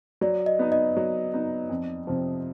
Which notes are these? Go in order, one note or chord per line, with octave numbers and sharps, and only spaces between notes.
F#3 D5
D#5
B3 D#4
D#5
F#3
B3 D#4
F2
C3 F3